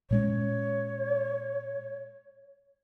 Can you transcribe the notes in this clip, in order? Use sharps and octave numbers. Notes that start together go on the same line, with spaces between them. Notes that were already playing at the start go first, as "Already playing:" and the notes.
A#2 G#3 C#4 C#5